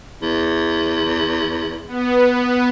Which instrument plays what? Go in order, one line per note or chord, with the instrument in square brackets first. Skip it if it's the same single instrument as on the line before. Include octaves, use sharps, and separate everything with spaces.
[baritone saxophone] E2
[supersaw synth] B3